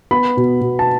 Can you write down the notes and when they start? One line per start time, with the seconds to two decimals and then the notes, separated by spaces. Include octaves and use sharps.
0.11 B3 B5
0.37 B2
0.61 B2
0.79 A5